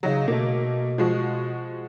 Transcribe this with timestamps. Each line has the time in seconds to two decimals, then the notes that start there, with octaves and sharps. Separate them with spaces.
0.03 C#3 F#3 D#4
0.28 B2 A3 A#3
0.98 F3 G#3 F#4